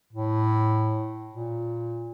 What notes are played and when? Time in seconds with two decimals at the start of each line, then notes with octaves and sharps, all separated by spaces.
0.13 A2
1.33 A#2